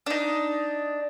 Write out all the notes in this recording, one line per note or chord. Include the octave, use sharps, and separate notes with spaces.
D4 D#4